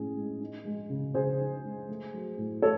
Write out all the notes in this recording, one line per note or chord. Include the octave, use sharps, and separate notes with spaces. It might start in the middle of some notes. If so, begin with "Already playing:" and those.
Already playing: A2 G#3 C#4 G#4
G#3
D#4
G#3
C#3
C#3 G#4 C5
D#4
G#3
A3
F#3
A2
A2 A4 C#5